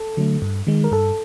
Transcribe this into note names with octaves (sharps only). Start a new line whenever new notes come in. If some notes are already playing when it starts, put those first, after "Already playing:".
Already playing: A4
D3 F#3 A3
G2
D#3 G#3
A#4
G2 A4